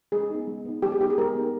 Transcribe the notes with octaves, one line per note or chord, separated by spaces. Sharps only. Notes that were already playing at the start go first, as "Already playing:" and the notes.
G#3 G#4
B3 D#4
G#3
B3 D#4
G#3 G4
G#4
B3 D#4 G4
G#4
G#3 A#4
B3 D#4